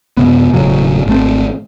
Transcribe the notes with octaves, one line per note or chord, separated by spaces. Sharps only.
F#2 C3 B3
E1 A2 C#3 F#3
G#1 A3 C4